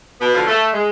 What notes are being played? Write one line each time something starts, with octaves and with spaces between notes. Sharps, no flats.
B2 B3
D3 F3
A3
G#3